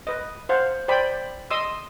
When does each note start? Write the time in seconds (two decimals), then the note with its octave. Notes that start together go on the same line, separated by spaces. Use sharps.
0.07 B4 D#5
0.49 C5 F5 F#5
0.88 C5 D5 G5 B5
1.50 D#5 C6 D#6 E6